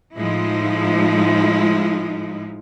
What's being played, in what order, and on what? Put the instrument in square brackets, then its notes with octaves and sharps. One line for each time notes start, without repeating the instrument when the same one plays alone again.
[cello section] A2 F3 G#3 D#4 E4